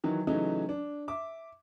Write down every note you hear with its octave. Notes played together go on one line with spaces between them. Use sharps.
D#3 E3 F#3
C#3 E3 F#3 A3 C#4 D#4
D4
E5 D6